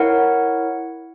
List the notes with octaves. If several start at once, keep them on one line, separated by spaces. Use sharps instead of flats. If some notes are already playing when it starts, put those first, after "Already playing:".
Already playing: E4 A#4 C#5 F#5